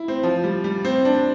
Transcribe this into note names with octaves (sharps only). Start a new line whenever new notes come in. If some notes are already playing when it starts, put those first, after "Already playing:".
Already playing: E4
C4
F3
G3
G3
C4
D4